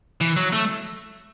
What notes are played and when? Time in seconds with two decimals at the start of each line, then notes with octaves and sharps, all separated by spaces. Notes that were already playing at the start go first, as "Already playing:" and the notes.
0.21 E3
0.37 F#3
0.53 A3